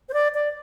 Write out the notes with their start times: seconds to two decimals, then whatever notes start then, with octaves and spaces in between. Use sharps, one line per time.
0.09 C5
0.13 D5
0.34 D5